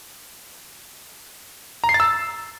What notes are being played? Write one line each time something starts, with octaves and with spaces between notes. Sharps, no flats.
A#5
C7
A6
E6